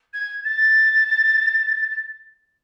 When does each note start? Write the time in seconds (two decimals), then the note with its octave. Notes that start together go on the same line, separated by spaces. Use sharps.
0.13 G#6
0.44 A6